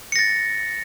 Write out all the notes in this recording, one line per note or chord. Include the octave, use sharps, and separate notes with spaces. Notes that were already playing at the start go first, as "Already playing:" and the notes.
A6 A#6 C#7